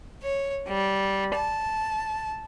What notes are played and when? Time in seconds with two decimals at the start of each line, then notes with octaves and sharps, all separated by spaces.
0.23 C#5
0.68 G3
1.35 A5